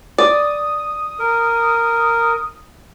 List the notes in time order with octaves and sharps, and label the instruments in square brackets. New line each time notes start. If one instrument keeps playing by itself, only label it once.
[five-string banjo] D5 [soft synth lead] D#6
[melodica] A#4